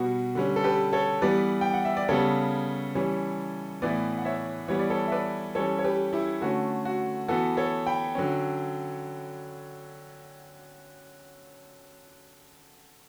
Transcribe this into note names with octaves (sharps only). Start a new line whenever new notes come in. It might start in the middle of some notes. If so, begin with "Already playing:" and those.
Already playing: B2 G3 B3 F#4
D3 G3 C#4
A4
G4 B4
A4 C#5
E3 G3 B3 B4 D5
G5
F#5
E5
D5
C#3 G3 B3 A4 C#5
E3 G3 C#4
A2 E3 B3 B4 D5
F#5
C#5 E5
E3 G3 B3 C#5
D5
A4 C#5
E5
B4 D5
E3 G3 C#4 A4 C#5
C#5
G4 B4
E4 G4
D3 A3 C#4 F#4
F#4
E3 B3 F#4 A4
A4 C#5
G5 B5
D3 F#3 C#4